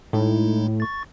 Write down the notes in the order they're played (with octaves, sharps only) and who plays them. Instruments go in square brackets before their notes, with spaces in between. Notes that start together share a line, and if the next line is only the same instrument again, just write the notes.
[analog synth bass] A2 [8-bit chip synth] G#3 D#4 E4
[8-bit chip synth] C#6 A6